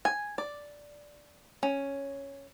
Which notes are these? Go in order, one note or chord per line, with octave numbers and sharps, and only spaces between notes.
G#5
D5
C#4